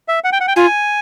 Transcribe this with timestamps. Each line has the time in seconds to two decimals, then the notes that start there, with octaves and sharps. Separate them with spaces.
0.08 E5
0.24 F#5
0.33 G5
0.41 F#5
0.48 G5
0.56 F4 G#5